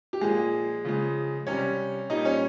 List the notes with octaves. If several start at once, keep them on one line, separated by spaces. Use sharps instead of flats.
G4
A#2 F3 G#3 G#4
C#3 F3 G#3
C3 G3 C#4 C#5
A#2 G3 D#4 D#5
C#4 C#5